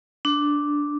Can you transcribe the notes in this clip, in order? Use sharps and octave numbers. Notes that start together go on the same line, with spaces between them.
D4